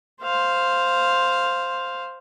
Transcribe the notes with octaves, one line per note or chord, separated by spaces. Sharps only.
C5 F5